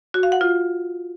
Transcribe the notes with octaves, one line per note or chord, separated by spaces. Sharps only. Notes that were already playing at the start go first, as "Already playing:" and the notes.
F#4
F5
F#5
F4